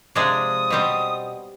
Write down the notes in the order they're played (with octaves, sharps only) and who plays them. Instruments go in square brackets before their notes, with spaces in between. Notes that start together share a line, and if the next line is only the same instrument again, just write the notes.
[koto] C3 F3 G#3 D4 G#4 [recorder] D#6
[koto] B2 G3 C4 G4